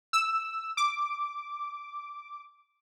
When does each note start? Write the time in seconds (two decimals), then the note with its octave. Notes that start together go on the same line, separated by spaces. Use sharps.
0.13 E6
0.77 D6